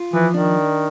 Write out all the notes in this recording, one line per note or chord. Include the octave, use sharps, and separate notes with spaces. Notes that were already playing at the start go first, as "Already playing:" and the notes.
Already playing: F4
E3 F3
D#3 D4